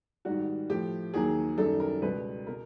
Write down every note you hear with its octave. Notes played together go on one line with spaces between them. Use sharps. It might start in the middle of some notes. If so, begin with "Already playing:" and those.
G#2 D#3 G3 F#4
A2 F3 G4
D#2 D#3 F#3 G#4
F#2 D#3 G3 A4
A#4
C#2 B2 G3 B4
B2 A#4